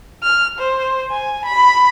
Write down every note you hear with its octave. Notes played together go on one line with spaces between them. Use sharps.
F6
C5
G#5
B5